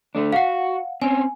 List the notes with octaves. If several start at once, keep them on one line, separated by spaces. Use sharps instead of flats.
D3 A3 D4
F#4 F5 F#5
C4 C#4 G#5